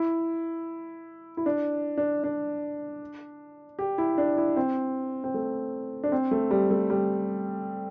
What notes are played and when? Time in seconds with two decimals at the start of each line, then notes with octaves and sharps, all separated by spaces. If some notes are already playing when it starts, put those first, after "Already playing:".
Already playing: E4
1.37 E4
1.46 D4
1.97 D4
2.24 D4
3.79 G4
3.98 E4
4.18 D4
4.37 E4
4.57 C4
5.24 C4
5.34 A3
6.04 D4
6.12 C4
6.31 A3
6.51 G3
6.71 A3
6.90 G3